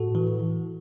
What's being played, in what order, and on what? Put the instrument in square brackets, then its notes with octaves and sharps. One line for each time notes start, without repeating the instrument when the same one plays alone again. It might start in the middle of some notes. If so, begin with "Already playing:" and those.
Already playing: [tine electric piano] A2 F#4 A4
E3